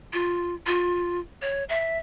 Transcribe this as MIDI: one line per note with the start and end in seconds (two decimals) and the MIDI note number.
0.13 0.54 65
0.66 1.20 65
1.42 1.64 73
1.69 1.98 76